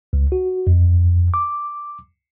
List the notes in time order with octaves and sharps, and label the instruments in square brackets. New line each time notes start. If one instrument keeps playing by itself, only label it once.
[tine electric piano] C#2
F#4
F2
D6